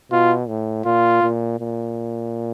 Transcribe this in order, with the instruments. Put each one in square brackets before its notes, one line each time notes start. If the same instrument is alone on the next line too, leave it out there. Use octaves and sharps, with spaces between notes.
[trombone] B2 [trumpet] F4
[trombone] A2
[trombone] A#2 [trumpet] F4
[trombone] A#2
A#2